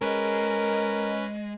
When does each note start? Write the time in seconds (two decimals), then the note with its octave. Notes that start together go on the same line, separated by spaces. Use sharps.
0.01 G#3 C#4 A#4 B4 D#5